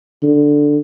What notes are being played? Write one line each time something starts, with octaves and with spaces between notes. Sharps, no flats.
D3